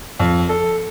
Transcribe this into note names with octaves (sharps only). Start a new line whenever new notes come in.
F2
A4